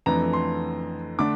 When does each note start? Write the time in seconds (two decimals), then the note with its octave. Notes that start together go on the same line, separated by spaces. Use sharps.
0.06 F2 E3 A3 D4 A#5
0.33 C6
1.19 D3 A3 D4 D6